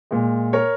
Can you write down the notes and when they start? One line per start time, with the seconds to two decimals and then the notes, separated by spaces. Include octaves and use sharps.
0.11 A#2 G#3
0.53 A#4 C#5